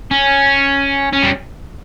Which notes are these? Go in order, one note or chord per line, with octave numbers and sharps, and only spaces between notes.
C#4
C#4
G3